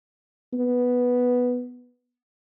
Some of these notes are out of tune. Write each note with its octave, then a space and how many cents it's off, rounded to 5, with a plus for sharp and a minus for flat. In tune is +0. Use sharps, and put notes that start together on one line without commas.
B3 +0